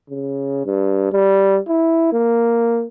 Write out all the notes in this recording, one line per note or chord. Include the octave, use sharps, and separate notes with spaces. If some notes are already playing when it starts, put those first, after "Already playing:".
C#3
G2
G3
E4
A#3